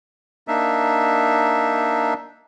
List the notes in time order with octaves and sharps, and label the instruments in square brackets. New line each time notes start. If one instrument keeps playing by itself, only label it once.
[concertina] A#3 D4 D#4 E5